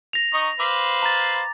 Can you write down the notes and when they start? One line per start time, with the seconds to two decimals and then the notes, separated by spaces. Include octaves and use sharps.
0.13 A#6 F7
0.33 D#4 D#5 C#6
0.60 B4 C5 F5 D6
1.03 A#5 A6